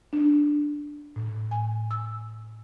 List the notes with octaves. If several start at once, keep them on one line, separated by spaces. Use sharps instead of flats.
D4
A2
G#5
E6